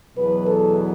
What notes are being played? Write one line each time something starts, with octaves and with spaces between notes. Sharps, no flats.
E2 B2 F#3 B3 B4
A4